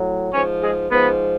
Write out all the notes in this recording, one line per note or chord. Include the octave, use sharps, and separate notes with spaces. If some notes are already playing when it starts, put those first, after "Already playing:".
Already playing: A2 F#3
G#2 F3 C#4 C#5
G#3 G#4
G#2 F3 B3 B4